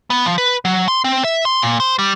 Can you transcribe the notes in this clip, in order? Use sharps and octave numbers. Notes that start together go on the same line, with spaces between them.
B3
F3
B4
F#3
C6
C4
E5
C6
A#2
C5
G3